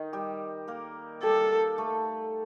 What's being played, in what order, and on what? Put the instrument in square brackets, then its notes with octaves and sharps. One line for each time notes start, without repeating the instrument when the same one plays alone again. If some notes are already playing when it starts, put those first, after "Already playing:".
Already playing: [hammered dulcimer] D#3 D#4
G3 G4
A#3 A#4
[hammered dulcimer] G3 G4 [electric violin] A4
[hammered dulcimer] A3 A4